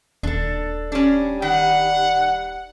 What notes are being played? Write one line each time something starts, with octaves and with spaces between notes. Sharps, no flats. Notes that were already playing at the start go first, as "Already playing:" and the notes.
D#1 D4 A4
G3 C#4 D4
D#3 F#5